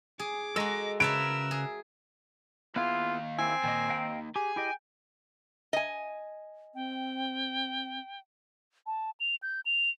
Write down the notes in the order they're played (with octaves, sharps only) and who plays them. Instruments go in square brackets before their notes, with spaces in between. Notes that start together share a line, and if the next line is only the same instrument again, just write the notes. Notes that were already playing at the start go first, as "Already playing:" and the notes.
[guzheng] G#4 [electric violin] D6
[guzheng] G#3 F#4 [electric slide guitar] A4 D#5 A#5
[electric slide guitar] C#3 B4 [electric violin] A#4 E6 [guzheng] C#5 E5 A5 [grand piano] D7
[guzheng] G#4
[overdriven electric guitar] D#2 F5 [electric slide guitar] B3 E4 G#4 [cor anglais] F4
[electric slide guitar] A#3 E4 [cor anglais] C4 [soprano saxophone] G#5
[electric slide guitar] A#2 D#5 [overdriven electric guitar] D#3 A#3
[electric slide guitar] D#5 F5 G5
[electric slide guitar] G4 [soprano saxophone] G#4 [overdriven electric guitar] G#5
[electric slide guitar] E4 G4 D#5 [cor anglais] G5
[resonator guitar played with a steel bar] D#5 G#5
[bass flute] C4 [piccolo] G5
[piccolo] A5
F7
G6
F7